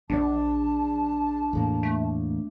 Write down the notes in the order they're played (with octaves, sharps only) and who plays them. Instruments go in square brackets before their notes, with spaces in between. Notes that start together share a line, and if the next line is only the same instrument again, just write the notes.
[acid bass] A#1 [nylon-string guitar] D4 D5 [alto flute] A5
[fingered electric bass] E2 A2 A#3
[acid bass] A3